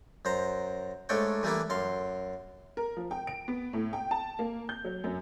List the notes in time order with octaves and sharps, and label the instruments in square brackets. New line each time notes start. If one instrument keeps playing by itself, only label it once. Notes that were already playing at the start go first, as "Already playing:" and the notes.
[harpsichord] F#2 C5 A#5
G#2 A3 D4 C#5 G5
E3 G3 A3 A#3 D4 E4
F#2 F5 C6
[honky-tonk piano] A#4
F3
G5
D7
B3
A2
G5
A5
A#3
G6
F#3
F#2